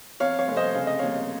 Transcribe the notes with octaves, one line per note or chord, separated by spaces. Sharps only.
F2 C#5 F5
C#5 F5
F1
C5 D#5
C#3 F5
D#5
D#2 C#5 F5